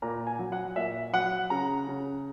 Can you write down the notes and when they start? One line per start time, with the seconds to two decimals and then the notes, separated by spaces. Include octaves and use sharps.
0.02 A#2 A#5
0.27 G#5
0.39 F#3
0.52 F#5
0.76 A#2 E5
1.13 F#3 F#5
1.50 C#3 A#5
1.88 C#3